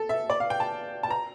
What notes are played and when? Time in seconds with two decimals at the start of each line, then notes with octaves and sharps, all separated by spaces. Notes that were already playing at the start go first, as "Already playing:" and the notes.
Already playing: A4
0.09 E5
0.30 D5
0.40 F5
0.50 G5
0.60 A5
1.03 A5
1.10 A#5